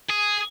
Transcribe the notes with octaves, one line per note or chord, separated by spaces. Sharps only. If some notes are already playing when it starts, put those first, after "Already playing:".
G#4